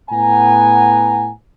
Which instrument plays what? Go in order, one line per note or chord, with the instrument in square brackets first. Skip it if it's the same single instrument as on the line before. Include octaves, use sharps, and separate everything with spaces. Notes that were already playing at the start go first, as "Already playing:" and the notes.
[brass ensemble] A2 B3 F#5 G#5 A#5